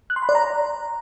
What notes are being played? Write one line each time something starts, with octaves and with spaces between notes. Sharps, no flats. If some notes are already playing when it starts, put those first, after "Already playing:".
F#6
C6
B5
D5
A#5